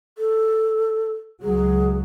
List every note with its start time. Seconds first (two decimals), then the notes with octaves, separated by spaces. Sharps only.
0.18 A4
1.42 C#2 F#3 G#4